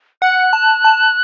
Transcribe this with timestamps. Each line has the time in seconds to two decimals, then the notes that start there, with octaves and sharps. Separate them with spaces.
0.22 F#5 F#6
0.53 A5
0.84 A5